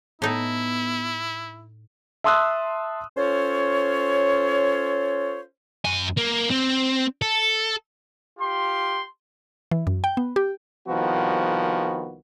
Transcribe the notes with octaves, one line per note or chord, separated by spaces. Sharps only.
A2 B3 D#4 E4
E5 A5 C6 D#6 E6 F#6
C#4 F4 A4 C5 C#5
F#2 G#5
A#3
C4
A4
F4 G4 C6
E3
F#2
G5
B3
G4
C2 D#3 F3 B3 F#4